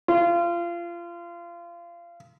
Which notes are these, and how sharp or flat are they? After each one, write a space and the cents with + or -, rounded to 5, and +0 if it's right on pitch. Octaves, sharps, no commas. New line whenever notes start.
F4 -25